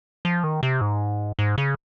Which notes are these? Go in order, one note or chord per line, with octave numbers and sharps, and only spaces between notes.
F3
D#3
C3
G#2
G#2
C#3